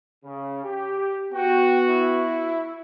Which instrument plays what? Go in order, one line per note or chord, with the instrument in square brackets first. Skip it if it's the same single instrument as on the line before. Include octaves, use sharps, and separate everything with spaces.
[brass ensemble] C#3
G4
[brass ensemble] B3 F#4 [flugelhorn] G5
[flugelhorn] E4